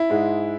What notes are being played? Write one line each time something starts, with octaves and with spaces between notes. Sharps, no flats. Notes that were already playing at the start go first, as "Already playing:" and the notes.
Already playing: E4
G#2 G#3